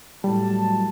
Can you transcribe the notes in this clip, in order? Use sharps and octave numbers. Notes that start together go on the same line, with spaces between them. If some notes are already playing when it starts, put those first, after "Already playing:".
A2 F#3 G3 A5